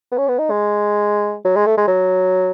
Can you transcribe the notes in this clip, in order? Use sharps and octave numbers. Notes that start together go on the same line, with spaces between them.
B3
C#4
B3
D#4
G#3
F#3
G#3
A3
G#3
F#3